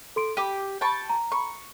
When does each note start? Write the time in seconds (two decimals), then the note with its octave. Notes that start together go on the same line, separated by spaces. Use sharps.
0.16 A4 C6 D7
0.37 G4 D6 D#7
0.81 G5 A5 C#6
1.10 A#5
1.32 C#6